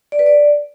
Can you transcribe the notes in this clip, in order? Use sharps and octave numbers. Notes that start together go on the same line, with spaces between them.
D5
B4
D5